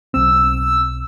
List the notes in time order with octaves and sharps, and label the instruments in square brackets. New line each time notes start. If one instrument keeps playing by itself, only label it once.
[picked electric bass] B1 C4 [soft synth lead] E6